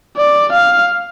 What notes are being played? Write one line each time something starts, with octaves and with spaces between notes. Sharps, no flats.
D5
F5